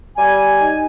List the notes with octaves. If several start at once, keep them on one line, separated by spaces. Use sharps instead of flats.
G3 G#5
D#4